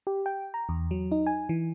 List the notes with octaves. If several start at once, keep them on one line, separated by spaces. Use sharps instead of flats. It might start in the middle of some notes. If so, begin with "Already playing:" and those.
G4
G5
A#5
E2
F#3
D#4
G#5
E3